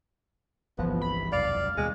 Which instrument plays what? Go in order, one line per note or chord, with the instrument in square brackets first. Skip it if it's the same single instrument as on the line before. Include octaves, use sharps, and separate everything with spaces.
[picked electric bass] G1 C2 E3 [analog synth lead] F3 [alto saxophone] B3
[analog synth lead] B5
[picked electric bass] E1 C2 F#2 [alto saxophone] D5 [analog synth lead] F5
[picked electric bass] D#2 B2 G3 [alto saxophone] G#3